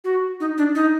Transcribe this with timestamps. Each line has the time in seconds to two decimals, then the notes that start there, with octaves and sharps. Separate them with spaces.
0.04 F#4
0.40 D#4
0.58 D4
0.75 D#4